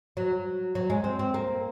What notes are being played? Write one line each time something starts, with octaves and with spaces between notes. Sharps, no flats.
F#3
F#3
G#3
C4
C4
A#3